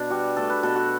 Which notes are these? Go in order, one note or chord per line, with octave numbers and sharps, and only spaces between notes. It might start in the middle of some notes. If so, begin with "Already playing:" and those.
Already playing: B2 D4
G3 F#4
A3 A4
B4
B2 A4
F#4